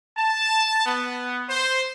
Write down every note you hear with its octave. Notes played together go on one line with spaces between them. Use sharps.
A5
B3
C5